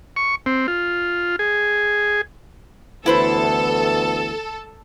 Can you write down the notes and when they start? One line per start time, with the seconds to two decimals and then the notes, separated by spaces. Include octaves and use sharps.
0.16 C#6
0.46 C4
0.68 F4
1.39 G#4
3.06 D2 E3 B3 E4 A4 B4 C5